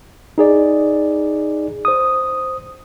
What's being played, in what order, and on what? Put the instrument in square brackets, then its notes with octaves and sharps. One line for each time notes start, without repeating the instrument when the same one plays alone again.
[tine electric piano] D#4 G#4 D5
C5 D#6